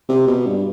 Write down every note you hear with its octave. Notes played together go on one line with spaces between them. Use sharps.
C3
B2
G2